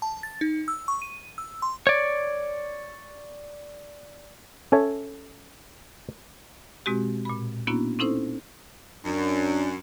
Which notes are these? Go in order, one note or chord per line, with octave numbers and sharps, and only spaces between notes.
A5
A6
D#4
E6
C#6
D#7
E6
C6
C#5 D5
C#4 A4 C#5 E5
B2 G#3 C4 F#4 G4
A#2 B5
A#3 B3 C#4 D4 E4 F#4
C4 C#4 D#4 E4 A4 C5
F#2 D4